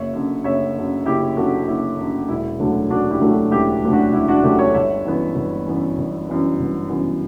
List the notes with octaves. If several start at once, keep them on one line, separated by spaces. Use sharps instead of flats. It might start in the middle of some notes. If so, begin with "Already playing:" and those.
Already playing: F#1 C#5 E5
F#2 D3
F#1 C#5 E5
F#2 D3
F#1 E4 G4
F#2 D3 F#4 A4
F#1 E4
F#2 D3
E1 E4
D2 D3 F#3 A3
E1 D4 F#4
E4 G4
D2 D3 F#3 A3
D4 F#4
E1 E4 G4
D2 D3 F#3 A3
D4 F#4
E1 E4
D4 F#4
D2 D3 F#3 A3 E4 G4
A4 C#5
G1 C#5 E5
F#2 E3 B3
G1
F#2 E3 B3
G1
F#2 E3 B3
G1
F#2 E3 B3